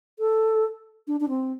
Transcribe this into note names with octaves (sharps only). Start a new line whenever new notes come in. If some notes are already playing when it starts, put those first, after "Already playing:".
A4
D4
D4
C4